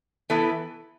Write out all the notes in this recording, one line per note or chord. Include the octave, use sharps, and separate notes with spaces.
E3 B3 E4 A4